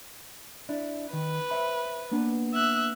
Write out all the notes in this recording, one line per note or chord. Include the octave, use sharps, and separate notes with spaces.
D4 E4
D#3 B4
C5 E5 B5
A#3 B3 D4
E5 F#6